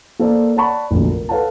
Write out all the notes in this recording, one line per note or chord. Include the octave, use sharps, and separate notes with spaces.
A#3 A4 A#4 C5 D5
C#5 D5 F#5 A5 B5 C#6
F1 A#1 F#2 D3
A#4
A4 B4 C#5 F5 F#5 A5